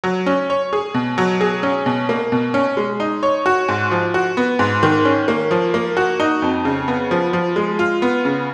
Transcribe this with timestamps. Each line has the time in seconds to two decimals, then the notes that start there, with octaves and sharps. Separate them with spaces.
0.04 F#3
0.26 C#4
0.50 C#5
0.73 G#4
0.94 B2
1.18 F#3
1.41 G#4
1.63 C#4
1.86 B2
2.09 A#3
2.32 B2
2.54 C#4
2.77 G#3
3.00 D#4
3.23 C#5
3.46 F#4
3.68 G#2
3.91 F3
4.14 F#4
4.37 B3
4.59 G#2
4.83 D#3
5.05 C#4
5.28 A#3
5.51 F3
5.74 A#3
5.97 F#4
6.20 D#4
6.42 F2
6.65 C#3
6.88 B3
7.11 F3
7.33 F3
7.56 G#3
7.79 F4
8.02 B3
8.25 C#3